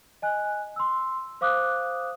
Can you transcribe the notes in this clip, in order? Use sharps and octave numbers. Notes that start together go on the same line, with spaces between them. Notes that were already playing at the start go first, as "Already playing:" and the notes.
D#5 G#5 F#6
C6 E6
C5 F5 D6 D#6 F#6